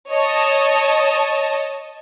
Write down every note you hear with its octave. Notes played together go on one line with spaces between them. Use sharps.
C#5 D#5 A5